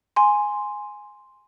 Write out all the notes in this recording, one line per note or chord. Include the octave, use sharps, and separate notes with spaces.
G#5 C6